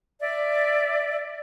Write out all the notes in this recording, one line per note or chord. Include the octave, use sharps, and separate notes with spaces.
D5 E5